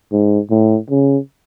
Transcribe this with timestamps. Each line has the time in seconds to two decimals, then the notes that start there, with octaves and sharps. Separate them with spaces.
0.12 G#2
0.51 A2
0.90 C#3